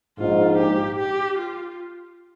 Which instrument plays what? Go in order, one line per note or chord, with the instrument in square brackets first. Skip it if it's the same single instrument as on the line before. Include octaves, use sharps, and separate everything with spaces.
[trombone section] A#1 G#2 F3 G#3 D#4 [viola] F4
[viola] G4
G4
F4